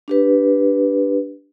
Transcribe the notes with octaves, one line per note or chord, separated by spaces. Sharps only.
D4 G4 B4